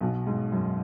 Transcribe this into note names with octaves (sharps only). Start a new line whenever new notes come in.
B1 B2
G#2
F#2